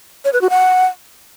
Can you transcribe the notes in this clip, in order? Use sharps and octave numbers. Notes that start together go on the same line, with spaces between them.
C#5
B4
F#4
F#5